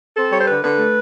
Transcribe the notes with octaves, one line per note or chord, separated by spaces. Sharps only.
C4 A4
G3 C#5
C5
D3 B4
D3 B4
A3